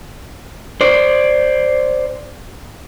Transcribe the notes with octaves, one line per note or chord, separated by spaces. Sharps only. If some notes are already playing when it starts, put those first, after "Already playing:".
C5 D5